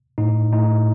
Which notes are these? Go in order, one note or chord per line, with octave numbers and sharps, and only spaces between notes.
A2 D#4
A2 D#4